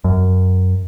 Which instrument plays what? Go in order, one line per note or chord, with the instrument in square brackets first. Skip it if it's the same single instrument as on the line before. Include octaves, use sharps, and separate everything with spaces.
[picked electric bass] F#2